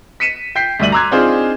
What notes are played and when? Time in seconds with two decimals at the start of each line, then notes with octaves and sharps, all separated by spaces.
0.20 B6 C#7 D#7 E7
0.55 G5 G6 B6 C7
0.79 D2 G2 D5 E5 D#7 F#7
0.92 A#5 C6 D6 E6 F#6 G#6
1.11 C4 D4 D#4 F4 G#4 C5